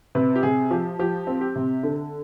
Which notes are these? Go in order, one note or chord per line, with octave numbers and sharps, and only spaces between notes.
C3 B4
G4
C3 G#4
F3 G4
F3 G4
C4
G4
C3
D3